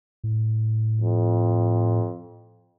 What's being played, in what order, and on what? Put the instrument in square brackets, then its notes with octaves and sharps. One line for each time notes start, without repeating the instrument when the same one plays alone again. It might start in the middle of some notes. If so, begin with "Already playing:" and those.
[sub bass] A2
[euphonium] F2